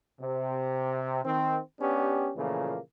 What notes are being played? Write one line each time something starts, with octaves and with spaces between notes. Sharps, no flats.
C3
D#3 C4
B3 C#4 D4 G4
A#2 C#3 E3 F3 A3 A#3